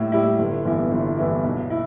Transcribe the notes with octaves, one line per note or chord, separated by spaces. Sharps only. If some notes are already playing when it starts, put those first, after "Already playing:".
Already playing: A2 G3 E4
G3 E4
G1
G2 E3 B3 E4
G1
G2 E3 B3 E4
B1
E4